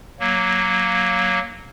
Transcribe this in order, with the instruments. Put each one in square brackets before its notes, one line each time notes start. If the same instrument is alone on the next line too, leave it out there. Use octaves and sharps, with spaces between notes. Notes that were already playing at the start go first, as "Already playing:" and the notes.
[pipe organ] F#3 A#3